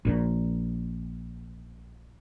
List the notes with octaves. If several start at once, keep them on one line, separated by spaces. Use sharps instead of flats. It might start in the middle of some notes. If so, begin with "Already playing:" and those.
A#1 A#2